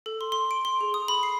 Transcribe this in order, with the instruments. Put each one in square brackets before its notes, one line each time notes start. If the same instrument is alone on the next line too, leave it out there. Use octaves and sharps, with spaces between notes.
[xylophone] A4
C6
C6
D7
C6
G#4
D#6
B5
C7